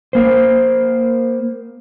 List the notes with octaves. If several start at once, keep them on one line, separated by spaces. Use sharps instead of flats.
A#3 C5